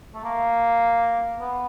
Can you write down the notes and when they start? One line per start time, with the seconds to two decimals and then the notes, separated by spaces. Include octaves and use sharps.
0.15 A3
0.24 A#3
1.40 B3